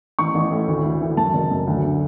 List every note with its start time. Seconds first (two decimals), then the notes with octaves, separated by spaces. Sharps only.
0.19 A1 C#6
0.35 A1
0.51 A2
0.68 D2
0.84 D2
1.01 E3
1.17 F#2 A5
1.34 F#1
1.51 F#2
1.67 D2
1.84 D3